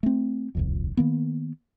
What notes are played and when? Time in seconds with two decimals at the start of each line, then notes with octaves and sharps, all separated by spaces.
0.03 A3 C4
0.55 D#1 C2 F2
0.97 D#3 A#3 B3